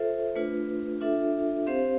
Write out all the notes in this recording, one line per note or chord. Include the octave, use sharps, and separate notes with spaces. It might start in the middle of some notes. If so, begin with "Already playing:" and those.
Already playing: F4 A4 C5 E5
A3 D4 F4 B4
D4 F4 A4 E5
C4 G4 C5 F5